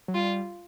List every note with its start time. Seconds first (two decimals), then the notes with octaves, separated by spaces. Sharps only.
0.08 F#3
0.15 G3 F4